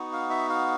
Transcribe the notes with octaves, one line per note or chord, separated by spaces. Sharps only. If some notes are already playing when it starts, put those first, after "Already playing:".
Already playing: B3 D#4 F#4
F5
E5
F5